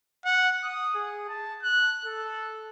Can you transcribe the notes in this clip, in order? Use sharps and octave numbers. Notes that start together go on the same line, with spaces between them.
F#5
D#6
G#4
A5
F#6
A4